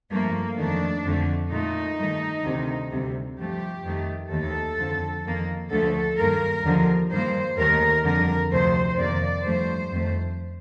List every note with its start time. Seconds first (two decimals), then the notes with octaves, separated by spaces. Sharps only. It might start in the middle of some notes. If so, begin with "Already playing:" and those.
0.11 G2 F3 A3 A#3
0.57 F2 D#3 A3 D4
1.05 F2 D3 A3
1.51 A#2 A3 D#4
1.98 G2 D#3 A3
2.44 D2 C3 D#3
2.92 D2 C3 G3
3.38 G2 F3 A3 G4
3.84 F2 D#3 A3
4.31 D#2 D#3 A3 A4
4.78 F2 D3 F3
5.25 F2 D#3 A#3
5.71 D2 D3 F3 A3 A4
6.18 G2 D#3 A#3 A#4
6.64 D#2 D3 F3
7.11 G2 D#3 G3 A#3 C5
7.58 D#2 D#3 A3 A#4
8.04 F2 D3 G3 A#4
8.51 D2 C3 F3 A3 C5
8.98 F2 C3 D#3 A#3 D5
9.44 G2 F3 A3 C5
9.91 F2 D#3 A3